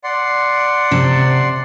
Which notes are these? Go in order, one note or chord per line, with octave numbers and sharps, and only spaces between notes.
D5 F#5 C6
C3 A5